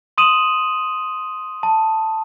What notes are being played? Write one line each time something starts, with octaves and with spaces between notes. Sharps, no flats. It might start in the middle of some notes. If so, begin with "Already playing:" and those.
C6 D#6 D#7 E7 F#7
A5